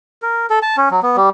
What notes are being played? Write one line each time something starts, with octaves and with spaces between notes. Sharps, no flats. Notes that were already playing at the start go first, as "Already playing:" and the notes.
A#4
A4
A5
C#4
F#3
B3
G3